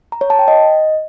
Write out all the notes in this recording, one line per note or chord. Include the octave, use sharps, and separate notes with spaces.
A#5
C#5
A5
G5
D#5